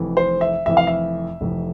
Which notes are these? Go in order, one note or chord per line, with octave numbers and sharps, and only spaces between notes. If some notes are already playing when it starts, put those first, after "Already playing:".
Already playing: F1 F2 E3
C5
E5
F1 F2 E3 E5
F5
E5
F1 F2 E3